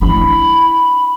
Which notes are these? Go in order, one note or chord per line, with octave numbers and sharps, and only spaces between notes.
D4 E4 B5